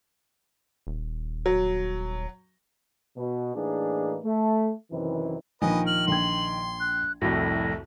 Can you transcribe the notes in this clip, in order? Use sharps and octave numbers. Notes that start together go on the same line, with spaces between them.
D#1
F#3
B2
A2 E3 A#3 D4 D#4 G#4
A3
F#2 C3 D#3 E3
A#1 D#3 F3 B4 D#5 G#5
F6 F#7
A#1 G5 C6 G#6
F#6
C2 F2 A2 F#4 A#6